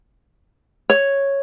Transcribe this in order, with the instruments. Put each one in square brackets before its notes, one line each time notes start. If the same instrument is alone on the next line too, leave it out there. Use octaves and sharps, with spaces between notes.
[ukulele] C#5